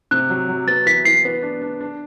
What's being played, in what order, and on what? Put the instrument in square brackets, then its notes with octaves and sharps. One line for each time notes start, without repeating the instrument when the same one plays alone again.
[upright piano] C3 [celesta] F#6
[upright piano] F#3
F#3
[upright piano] B3 [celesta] A6
[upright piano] E3 [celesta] B6
[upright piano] E3 [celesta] C7
[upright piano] B3
D4
D4
D4